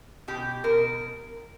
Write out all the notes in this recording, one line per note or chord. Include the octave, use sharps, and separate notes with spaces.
B2 G4
B2 A#4